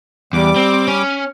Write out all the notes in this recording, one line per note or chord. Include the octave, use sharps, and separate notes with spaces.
E2 G3 D6
C4
C#4 C#5